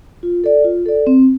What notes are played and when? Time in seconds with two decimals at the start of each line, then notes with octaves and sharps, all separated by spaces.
0.23 F4
0.44 A4 D5
0.65 F4
0.86 A4 D5
1.07 C4